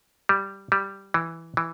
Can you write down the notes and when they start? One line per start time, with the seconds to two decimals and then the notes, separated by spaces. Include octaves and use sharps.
0.29 G3
0.72 G3
1.14 E3
1.57 E3